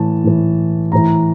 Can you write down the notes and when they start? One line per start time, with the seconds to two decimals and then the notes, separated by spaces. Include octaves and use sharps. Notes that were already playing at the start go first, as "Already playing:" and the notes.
Already playing: A2 E3 A5
0.24 A2 E3
0.92 A2 E3 A#5